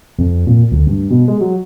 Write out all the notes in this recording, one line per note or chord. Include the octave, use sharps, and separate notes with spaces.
F2
A#2
D2
G2
B2
G#3
F#3